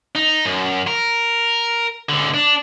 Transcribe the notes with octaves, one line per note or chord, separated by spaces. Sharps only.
D#4
F#2
A#4
C#2 D3
D4